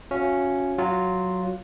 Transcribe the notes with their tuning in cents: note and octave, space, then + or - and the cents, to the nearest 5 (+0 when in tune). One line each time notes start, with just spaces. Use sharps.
C#4 +0 F#4 -25 F5 -45
F#3 +0 F4 +0